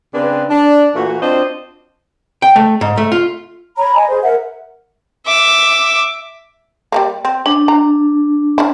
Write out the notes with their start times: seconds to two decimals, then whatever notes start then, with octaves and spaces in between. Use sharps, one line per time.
0.14 C#3 C4 D4 G#4 B4
0.50 D4
0.95 A#2 E3 A3 F#4
1.21 C4 D4 F4 F#4 C5 D#5
2.42 G5
2.56 A3
2.81 G#2
2.97 A3
3.12 F4
3.78 C#5 A#5 B5
3.96 D#5 G#5
4.09 G#4 C5
4.23 A#4 E5 F#5
5.27 E5 D6
6.92 G3 A3 A#3
7.25 C4
7.46 C#4 D4
7.68 A#5
8.58 C#4 E4